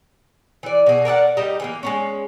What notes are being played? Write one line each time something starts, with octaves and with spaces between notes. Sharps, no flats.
E3 D5
B2 G#4
A#4 D5 E5 F#5
G3 D#4 G4 D#5
E3 G#3 A#3
G#3 B3 C#4